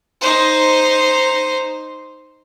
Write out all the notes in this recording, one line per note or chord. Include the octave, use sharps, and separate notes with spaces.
D#4 C5